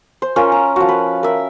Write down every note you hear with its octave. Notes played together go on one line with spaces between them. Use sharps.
C5
C#4 F4 A#4
A#5
F3 F#4
B4
A#4 E5